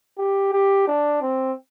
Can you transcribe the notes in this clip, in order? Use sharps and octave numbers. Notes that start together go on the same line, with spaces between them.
G4
G4
D4
C4